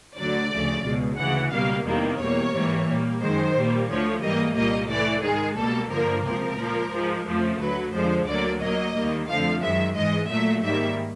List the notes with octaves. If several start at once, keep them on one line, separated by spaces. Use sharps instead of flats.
D2 D3 F#3 D5
D2 C#3 F3 A3
C#2 B2 G#3
D2 C#3 E3 F#5
C#2 B2 G3 A#3 F5
E2 C3 D#3 G3 A#3
E2 B2 G3 A#3 C#5
G#2 E3 G3 A#3
A#2 G3 A#3
F#2 D#3 G#3 C5
A#2 G3 A#3
D2 D3 F3 A3 C#5
G#2 E3 G3 A#3 D#5
C2 A#2 G3 A#3 D#5
A2 E3 A3 D5
G#2 D#3 G#3 G#4
C#2 B2 G3 A#3 A4
G2 D3 F3 A#3 A#4
C#2 C3 F3 A#4
A#2 F3 A#3
G#2 F3 G#3
F2 C#3 F3 A3
D2 D3 F#3 B4
F2 D3 F3 G#3 C5
D2 D3 F#3 A#3 D5
A#2 F#3 A#3 D#5
D#2 D#3 G3 A#3
F2 D3 F3 A3 F5
F#2 D#3 G#3 E5
G#2 E3 G#3 D#5
A#2 F#3 A3 E5
G#2 D#3 G3 A#3 E5